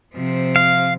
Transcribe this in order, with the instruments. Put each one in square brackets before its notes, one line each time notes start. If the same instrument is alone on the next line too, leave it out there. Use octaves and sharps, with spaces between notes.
[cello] C3 F3
[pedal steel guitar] F5